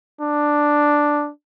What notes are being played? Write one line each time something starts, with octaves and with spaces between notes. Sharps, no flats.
D4